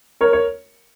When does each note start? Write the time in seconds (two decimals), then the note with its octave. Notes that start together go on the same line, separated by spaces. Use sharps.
0.21 A#4 C#5
0.33 C#5